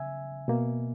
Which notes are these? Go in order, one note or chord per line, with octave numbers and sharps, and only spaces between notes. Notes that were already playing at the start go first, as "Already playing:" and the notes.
Already playing: C#3 E5 G#5
B2 A#3